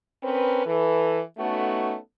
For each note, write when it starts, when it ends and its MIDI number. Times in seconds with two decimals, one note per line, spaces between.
0.24 0.64 60
0.24 0.64 61
0.24 0.64 70
0.24 0.64 71
0.66 1.21 52
0.66 1.21 69
0.66 1.21 71
1.38 1.97 57
1.38 1.97 59
1.38 1.97 61
1.38 1.97 63
1.38 1.97 66
1.38 1.97 69